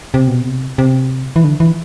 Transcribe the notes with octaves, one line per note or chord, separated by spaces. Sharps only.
C3
B2
C3
C3
E3
D3
E3